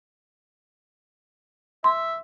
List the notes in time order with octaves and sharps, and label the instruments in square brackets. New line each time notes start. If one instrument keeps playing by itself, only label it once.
[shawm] E5 [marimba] C6